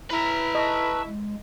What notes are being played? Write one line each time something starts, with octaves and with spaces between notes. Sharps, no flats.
E4 B4 A#5
D#5 A5 C#6 E6
G#3